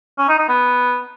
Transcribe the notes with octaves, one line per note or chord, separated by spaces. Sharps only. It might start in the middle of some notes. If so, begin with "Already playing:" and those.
C#4
D#4
D#4
B3